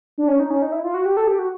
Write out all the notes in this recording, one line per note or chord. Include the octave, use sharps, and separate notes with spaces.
D4
C#4
D#4
C#4
D#4
E4
F4
F#4
G4
A4
G4
F#4